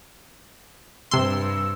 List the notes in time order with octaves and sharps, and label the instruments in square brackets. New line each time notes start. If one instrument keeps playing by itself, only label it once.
[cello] G2 [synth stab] C3 C6 [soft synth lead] E6